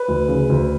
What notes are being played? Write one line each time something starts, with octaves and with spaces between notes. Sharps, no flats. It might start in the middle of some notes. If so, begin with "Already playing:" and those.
Already playing: B4
D2
C#3
D2